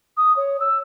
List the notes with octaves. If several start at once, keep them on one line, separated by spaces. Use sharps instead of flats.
D#6
C#5
E6